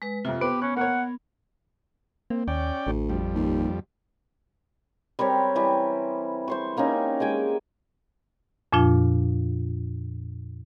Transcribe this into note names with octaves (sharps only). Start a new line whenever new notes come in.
G#3 B4
F2 C3 F4
B3 G4 B4 C5
C#4 F#6
A#3 A#4 C#5 F#5
A#3 C4
D#2 C#4 D5 G5
A1 D2
F2 G3
D#2
G3 C4 A#4 C#5
E3 G3
C5 C6 C#6
G3 A#3 C#4 D#4
G#3 G5 G#5 D6
F2 A#2 F3 D4 F4